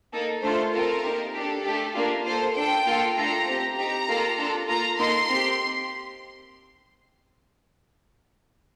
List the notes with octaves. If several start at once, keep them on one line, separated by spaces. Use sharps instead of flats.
A#3 D#4 A4
A3 D4 F4 A4 C5
C4 F4 A4 A#4
A#3 D#4 G4
D4 G4 A4
A3 D4 G4
A#3 D4 F4
A#3 F4 A4 C5
D4 A4 G5
A#3 F4 A4
A3 D4 F4 A4 A#5
C4 G4
C4 D#4 G4 A#5
A#3 F4 A4
D4 F4 A4
A#3 F4 A4 A#5
A#3 D#4 A4 C6
C4 G4